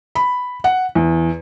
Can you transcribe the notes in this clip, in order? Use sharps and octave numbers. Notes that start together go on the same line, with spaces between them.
B5
F#5
E2